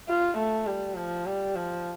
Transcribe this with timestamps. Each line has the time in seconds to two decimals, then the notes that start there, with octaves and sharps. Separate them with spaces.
0.08 F4
0.38 A3
0.67 G3
0.97 F3
1.26 G3
1.55 F3